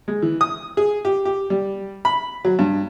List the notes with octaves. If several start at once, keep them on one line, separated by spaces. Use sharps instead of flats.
G#3
E3
D#6
G#4
G4
G4
G3
B5
F#3
G2